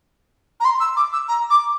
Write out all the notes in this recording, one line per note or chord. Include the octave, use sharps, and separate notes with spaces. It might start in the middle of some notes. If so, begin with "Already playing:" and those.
A#5
C6
E6
D6
E6
A#5
D6